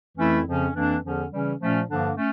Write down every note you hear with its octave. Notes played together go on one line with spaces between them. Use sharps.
F2 E3 A3 C#4 E4
F2 C#3 F3 C#4
F2 E3 A#3 D4
E2 D3 F3 C#4
C#3 E3 G3 C#4
A#2 F3 A3 C#4
G2 D3 F3 A#3 D4
A3 C#4